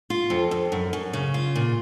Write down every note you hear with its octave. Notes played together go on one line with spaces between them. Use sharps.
F4
F2
F2
F#2
F#2
C#3
F4
A#2